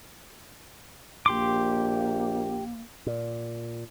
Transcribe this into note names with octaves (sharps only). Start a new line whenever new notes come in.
A#1 A#3 G4 C6 D6
A#2